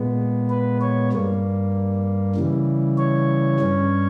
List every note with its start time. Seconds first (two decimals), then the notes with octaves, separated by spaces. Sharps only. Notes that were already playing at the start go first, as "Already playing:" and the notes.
Already playing: A#2 G#3 B3
0.50 B4
0.81 C#5
1.12 G2 G3 A#3
2.36 C#3 E3 G3
2.98 C#5
3.60 G2 G3 C#4